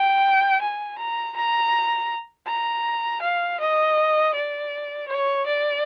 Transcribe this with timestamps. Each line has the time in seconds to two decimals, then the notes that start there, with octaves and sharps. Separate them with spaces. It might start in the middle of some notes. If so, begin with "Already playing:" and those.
Already playing: G5
0.62 G#5
0.98 A#5
1.36 A#5
2.47 A#5
3.22 F5
3.60 D#5
4.34 D5
5.08 C#5
5.46 D5